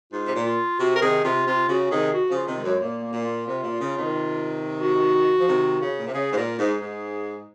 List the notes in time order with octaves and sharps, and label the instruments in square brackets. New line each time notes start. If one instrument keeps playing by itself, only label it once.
[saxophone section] G#2 [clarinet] F4
[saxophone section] C3
A#2
[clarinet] F4
[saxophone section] C3 [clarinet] F#4
[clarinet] A#4
[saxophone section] C3 D#3 [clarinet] G#4
[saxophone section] C3 [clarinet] F4
[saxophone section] C3 [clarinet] F4
[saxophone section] C#3 [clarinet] F#4
[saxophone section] C3 D#3 [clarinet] G#4
[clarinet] F#4
[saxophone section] C#3 F3
[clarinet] F4
[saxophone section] C3 D#3
[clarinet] G#3
[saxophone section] F#2
[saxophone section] A#2 [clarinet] A#3
[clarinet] A#3
[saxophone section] A#2
[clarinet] F4
[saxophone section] C3
A#2
C#3
C3 D#3
[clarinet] F#4
[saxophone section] F3
C3 D#3
C#3
A#2
C3
[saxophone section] C#3 [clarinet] G#4
[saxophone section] G#2
[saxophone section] A#2 [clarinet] A#4
[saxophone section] G#2 [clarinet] G#4
[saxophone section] G#2